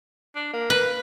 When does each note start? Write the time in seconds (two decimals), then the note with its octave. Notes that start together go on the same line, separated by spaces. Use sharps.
0.35 D4
0.53 A#3
0.70 B4